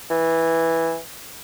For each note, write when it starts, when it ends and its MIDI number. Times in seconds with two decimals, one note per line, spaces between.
0.10 0.98 52